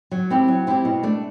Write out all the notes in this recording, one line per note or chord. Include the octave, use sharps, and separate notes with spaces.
F#3
C4 E4 G4
F#3
C4 E4 G4
B2
A3 D4